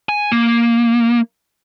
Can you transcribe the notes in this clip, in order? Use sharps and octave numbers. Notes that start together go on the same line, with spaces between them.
G#5
A#3